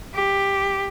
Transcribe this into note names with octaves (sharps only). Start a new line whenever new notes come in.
G4